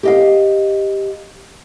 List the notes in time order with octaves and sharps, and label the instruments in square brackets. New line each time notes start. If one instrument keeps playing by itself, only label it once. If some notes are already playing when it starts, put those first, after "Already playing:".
[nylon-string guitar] G4 D#5 F5